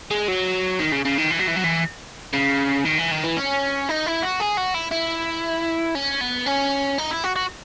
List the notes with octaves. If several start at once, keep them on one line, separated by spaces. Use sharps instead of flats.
G#3
F#3
D#3
C#3
C#3
D#3
E3
F#3
E3
F#3
E3
C#3
D#3
E3
D#3
E3
C#4
D#4
E4
F#4
G#4
F#4
E4
E4
C#4
B3
C#4
D#4
E4
F#4
F#4